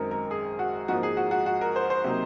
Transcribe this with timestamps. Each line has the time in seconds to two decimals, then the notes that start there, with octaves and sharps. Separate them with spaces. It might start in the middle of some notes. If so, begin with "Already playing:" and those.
Already playing: F#2 D#3 G#3 C4 D#4 A#4
0.11 A#4
0.31 G#4
0.59 F#4
0.88 G#2 F3 A#3 D#4 F#4
1.03 G#4
1.17 F#4
1.31 F#4
1.46 F#4
1.61 A#4
1.76 C5
1.90 C5
2.04 C3 F#3 A#3 D#4